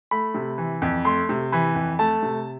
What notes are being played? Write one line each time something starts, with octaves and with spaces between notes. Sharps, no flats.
A3 B5
C3
E3
F2
A3 C6
C3
E3 B5
F2
A3 A5
C3